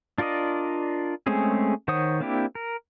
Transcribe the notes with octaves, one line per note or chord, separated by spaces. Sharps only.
D4 F4 A#4 D5 D#5
G#3 A3 C4 C#4 G#4
D#3 C5 C#5 F#5 D#6
A#3 C4 D4 E4 G4
A#4